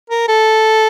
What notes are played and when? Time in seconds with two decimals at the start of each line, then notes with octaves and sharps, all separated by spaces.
0.10 A#4
0.28 A4